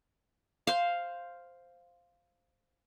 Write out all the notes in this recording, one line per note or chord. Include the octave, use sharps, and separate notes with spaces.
C5 F5